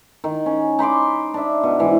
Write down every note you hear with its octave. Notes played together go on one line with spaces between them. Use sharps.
D#3
C#4
D#4 B5 C6 D6
D4 E5
B2
G#2 E3